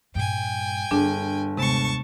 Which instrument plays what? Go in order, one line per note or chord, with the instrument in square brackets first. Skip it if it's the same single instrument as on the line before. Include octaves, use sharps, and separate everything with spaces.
[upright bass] G2 A#2 [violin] G5 G#5
[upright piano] G1 [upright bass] G3 [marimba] D4 G#4
[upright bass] D#2 [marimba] C3 G#3 B3 [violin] A5 C#6